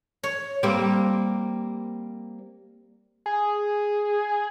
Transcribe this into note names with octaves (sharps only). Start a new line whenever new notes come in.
C#5
G3 A#3 C4
G#4